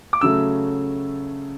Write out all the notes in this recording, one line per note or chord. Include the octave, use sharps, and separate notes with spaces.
D6
C#3 F#3 A3 E6